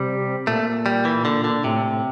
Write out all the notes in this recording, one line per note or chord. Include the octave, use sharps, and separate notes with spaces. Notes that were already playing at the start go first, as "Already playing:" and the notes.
Already playing: C3 G3
A#2 A3
G3
E3
D3
D3
A2 C3
A2